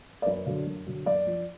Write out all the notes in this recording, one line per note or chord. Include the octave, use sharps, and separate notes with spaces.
D5
F#2 B4
D3 F#3
F#2
D3 F#3
F#2 D5
F3